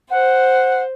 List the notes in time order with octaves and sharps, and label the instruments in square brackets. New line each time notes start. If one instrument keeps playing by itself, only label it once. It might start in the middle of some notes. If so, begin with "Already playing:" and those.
[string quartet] C5 [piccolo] F#5